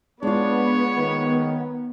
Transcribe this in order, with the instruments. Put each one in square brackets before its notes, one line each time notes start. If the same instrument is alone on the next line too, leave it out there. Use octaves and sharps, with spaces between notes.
[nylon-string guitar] G#3 F4 [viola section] B3 [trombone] D4 [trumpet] C#5
[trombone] D#3